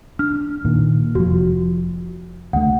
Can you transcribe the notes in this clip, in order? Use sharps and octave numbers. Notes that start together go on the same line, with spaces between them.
D4 F6
A#2 D#3
F1 F3 F#4
D2 A3 F#5